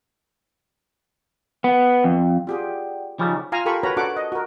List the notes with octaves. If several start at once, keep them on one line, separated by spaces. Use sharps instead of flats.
B3
F2
F4 G4 G#4 D5 F#5 G5
C#3 F3 G3 D#4 D#5 A#5
F4 F5 G#5 A#5
F4 G4 A4 A#4 B5 C#6
F#4 A#4 B4 C#5 A#5 B5
D4 F#4 A4 F#5 D6
D#5
F#4 A#4